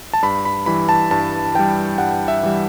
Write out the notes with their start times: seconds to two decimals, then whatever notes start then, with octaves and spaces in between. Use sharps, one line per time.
0.13 A5
0.22 G2 B5
0.45 B5
0.66 E3 G3 B5
0.89 A5
1.11 G2 A5
1.54 E3 G3 G5
1.98 G2 F#5
2.28 E5
2.43 E3 G3